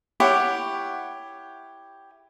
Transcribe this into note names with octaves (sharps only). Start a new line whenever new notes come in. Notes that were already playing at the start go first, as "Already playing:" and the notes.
E4 G4 C#5 F#5